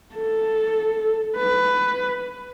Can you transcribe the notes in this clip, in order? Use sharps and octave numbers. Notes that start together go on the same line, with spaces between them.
A4
B4